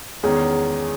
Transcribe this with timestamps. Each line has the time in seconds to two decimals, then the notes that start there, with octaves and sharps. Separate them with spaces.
0.23 E2 D#3 G#3 C#4 G#4